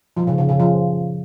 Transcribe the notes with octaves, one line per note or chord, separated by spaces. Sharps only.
F3
C#3
C#3
C#3
F3